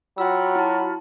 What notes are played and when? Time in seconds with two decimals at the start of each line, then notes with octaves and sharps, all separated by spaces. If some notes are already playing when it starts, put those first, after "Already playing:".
0.18 F#3 F4 F#4 G5 B5 E6
0.56 E4 A5